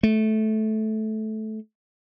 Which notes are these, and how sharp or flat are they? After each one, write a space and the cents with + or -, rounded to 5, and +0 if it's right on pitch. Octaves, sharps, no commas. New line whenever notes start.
A3 -15